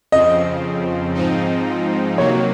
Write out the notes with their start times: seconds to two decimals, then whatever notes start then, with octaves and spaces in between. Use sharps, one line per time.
0.12 F2 C#3 F3 C4 D#5
1.15 G#2 F3 C4 D#4
2.18 C3 D#3 F#3 A#3 C#5